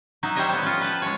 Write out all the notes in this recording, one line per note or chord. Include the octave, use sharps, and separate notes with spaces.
F#3 D#4 E5
G3 C5 C#5 D#5 E5 A#5
G3 B3
F3 C#4 F4
B4 A5
G#3 C#5